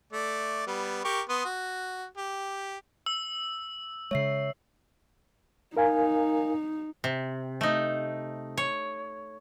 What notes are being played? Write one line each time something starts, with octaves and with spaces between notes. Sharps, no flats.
A3 D5
G3 B3
G4 A#4 C#6
B3 C6 D#6
F#4
G4
E6
C#3 G#3 C#5 E5 C7
D#4 A#4 F5 G#5
C3
A3 D#4
C#5